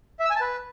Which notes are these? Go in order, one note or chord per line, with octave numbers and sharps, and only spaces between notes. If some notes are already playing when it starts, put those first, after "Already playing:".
E5
E6
G#5
A5
B4